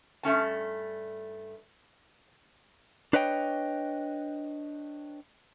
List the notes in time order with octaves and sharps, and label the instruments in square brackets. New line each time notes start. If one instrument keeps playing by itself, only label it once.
[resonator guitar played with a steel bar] G2 A3 C#4 A5
[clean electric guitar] D4 B4 C#5 D#5 G5